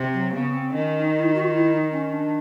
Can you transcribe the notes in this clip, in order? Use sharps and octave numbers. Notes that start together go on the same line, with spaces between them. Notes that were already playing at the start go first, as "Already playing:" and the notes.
Already playing: C3
F#3
C#3 B3
C4
D#3 C#4
D#4
E4
D#4
F#4
F4
E4
D#4
C#4
D4